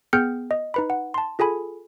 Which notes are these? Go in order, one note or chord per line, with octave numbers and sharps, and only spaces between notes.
B3 G#4 G5 F6 G6 C#7
D#5
D#4 B4 B5
F#5
A5 C6
F4 G#4 A4 G#5 B5